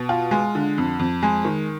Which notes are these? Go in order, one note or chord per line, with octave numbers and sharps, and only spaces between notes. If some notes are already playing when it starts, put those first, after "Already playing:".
Already playing: B2
F4
G#3
D3
F2
F2
G#3
D#3